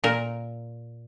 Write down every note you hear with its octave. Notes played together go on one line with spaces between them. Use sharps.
A#2 A#4